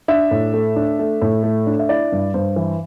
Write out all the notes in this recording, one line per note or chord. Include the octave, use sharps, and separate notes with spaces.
D4 E5
A2
A3
D4
A3
A2
A3
D4
E5
E4 D5
G2
G2 C5
E3